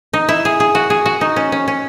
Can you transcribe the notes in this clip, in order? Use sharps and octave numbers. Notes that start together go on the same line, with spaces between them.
D#4
E4
G#4
G#4
F#4
G#4
F#4
D#4
C#4
C#4
C#4